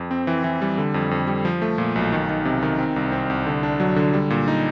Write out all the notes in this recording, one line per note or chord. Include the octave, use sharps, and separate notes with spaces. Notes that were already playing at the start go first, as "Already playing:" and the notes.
Already playing: F2
C4
E3
E3
G3
D3
F2
F2
G3
F3
A3
A#2
B1
D#3
D#3
C3
D#3
C4
C2
C4
C2
D3
D4
F#3
D3
G3
A#2
D#4